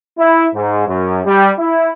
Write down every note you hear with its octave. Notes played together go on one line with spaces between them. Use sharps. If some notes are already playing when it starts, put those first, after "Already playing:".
E4
G#2
F#2
G3
E4